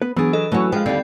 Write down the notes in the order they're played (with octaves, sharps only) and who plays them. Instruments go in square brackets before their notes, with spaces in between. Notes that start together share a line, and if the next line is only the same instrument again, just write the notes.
[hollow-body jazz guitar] B3 B4
[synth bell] E3 D4 [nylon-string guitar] F#3 G#4 [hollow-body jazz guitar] B3
[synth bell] A4 [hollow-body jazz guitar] B4 D#5
[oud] E3 C#5 [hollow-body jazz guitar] F#3 A3 [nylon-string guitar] C#4 F#4
[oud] F3 [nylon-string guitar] G#3 [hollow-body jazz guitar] B4 F5 [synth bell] G5
[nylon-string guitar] D#2 [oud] D3 G3 [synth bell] C4